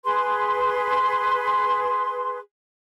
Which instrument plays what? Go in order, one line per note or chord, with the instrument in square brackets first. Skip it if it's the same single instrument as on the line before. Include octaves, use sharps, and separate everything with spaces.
[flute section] G#4 B4 C6